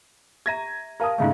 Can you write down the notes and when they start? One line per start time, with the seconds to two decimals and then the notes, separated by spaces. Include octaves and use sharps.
0.46 G4 E5 A#5 G#6 A#6 D#7
1.00 G4 A#4 F5 A5 D#6
1.18 G#2 C#3 A3 E5 F5